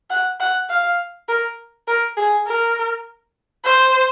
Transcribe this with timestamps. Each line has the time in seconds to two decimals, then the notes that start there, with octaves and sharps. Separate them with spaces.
0.10 F#5
0.40 F#5
0.70 F5
1.28 A#4
1.88 A#4
2.17 G#4
2.47 A#4
3.65 C5